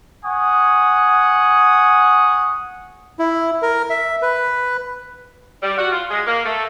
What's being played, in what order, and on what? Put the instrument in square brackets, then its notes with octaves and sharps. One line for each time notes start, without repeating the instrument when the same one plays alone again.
[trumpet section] F#5 G#5 C#6 D#6
[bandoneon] E4
A#4
E5
B4
[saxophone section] G3
F#4
F4
G#3
A#3
A3